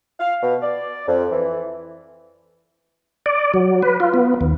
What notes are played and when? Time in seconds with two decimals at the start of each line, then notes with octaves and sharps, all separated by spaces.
0.20 F5
0.42 B2
0.62 D5
1.08 F2
1.32 E3
3.26 D5
3.54 F#3
3.82 B4
4.00 F4
4.14 B3
4.41 D#2